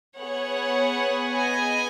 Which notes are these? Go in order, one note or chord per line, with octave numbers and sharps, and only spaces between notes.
B3 G#4 C#5 F#5
D#5 G#5